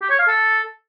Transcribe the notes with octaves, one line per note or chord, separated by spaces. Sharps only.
G4
C#5
F5
A4